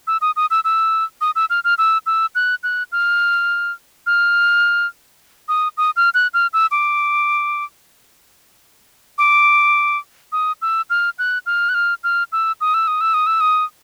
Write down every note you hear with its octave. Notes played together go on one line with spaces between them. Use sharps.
E6
D#6
D#6
E6
E6
D#6
E6
F6
F6
E6
E6
F#6
F#6
F6
F6
D#6
D#6
F6
F#6
F6
E6
D6
D6
D#6
E6
F6
F#6
F6
F#6
F6
F6
E6
D#6
E6
D#6
E6
D#6
E6
D#6